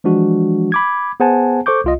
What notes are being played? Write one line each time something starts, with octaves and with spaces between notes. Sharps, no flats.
E3 F3 G#3 D4 F#4
B5 D6 G#6
B3 G#4 C5 F#5 G#5 A5
A4 C5 C#6 D6 G6
C2 F4 D#5